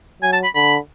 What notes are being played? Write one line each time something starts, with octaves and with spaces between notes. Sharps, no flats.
F#3 G#5
A5
B5
D3 B5